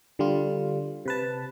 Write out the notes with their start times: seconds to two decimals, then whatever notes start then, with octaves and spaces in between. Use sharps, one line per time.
0.19 D3 G3 F4
1.05 C3 B4 A5